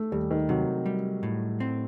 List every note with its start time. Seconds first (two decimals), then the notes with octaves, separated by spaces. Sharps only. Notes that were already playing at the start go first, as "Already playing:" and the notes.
Already playing: A3
0.12 D#2 G3
0.31 D#3
0.49 C3 F#3
0.86 G3
1.23 A2
1.60 C4